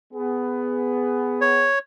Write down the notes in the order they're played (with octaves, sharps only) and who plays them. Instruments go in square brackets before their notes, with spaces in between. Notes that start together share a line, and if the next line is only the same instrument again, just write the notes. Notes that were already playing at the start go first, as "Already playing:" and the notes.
[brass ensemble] B3 G#4
[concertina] C#5